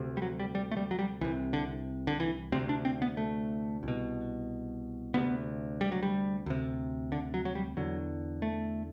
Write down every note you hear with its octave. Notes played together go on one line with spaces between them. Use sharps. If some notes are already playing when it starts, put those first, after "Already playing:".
Already playing: D2 C3
G3
F#3
G3
G3
A3
G3
F#3
G3
C2 C3 E3
D3
D3
E3
D2 C3 C4
D4
C4
B3
A3
C2 B2
D2 C3 B3
G3
F#3
G3
D2 C3
D3
F#3
F#3
G3
E2 D3 F#3
A3